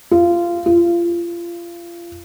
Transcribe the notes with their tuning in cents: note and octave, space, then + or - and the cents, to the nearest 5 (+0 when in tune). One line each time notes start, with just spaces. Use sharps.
F4 -20
F4 -30